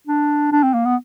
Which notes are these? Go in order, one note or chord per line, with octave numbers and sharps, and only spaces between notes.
D4
D4
C4
A#3
B3